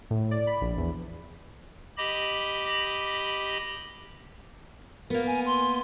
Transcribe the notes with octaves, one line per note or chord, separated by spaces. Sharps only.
A2
D5
B5
A#1
E2
G4 D#5 B5
A#3 B3 A#4
G#5
C6